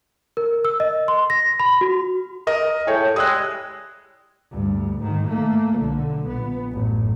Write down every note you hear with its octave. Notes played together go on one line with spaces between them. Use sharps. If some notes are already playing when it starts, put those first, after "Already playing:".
A#4
E6
D#5
C6
A#6
B5
F#4
A#4 D#5
A2 G#4 C#5 G5
G3 G#3 D#6 E6 F#6
D2 G2
G#2 D#3
A3 A#3
B1 D3
A#1 B3
A1 F#2